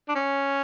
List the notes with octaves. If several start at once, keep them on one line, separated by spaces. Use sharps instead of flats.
D4
C#4